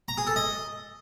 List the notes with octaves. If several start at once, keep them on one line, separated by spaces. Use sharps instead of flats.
A#5
G#4
A4
D#5